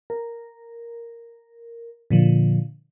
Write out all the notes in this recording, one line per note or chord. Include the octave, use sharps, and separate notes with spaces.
A#4
A#2 D3 F3